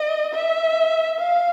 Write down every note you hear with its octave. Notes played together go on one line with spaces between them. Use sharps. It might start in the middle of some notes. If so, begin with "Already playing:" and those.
Already playing: D#5
E5
F5